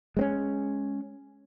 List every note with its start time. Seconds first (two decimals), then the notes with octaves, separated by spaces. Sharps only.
0.17 G#3 C4 C#4